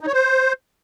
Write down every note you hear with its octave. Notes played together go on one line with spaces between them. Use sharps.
D#4
C#5
C5